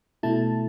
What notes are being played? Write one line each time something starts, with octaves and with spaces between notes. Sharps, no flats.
B2 A3 E4 A5